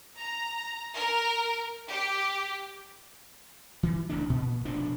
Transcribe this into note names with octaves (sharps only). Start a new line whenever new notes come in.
A#5
A#4
G4
E3
D1 A1 C#3 D4
A#2
F1 B2 F3 D4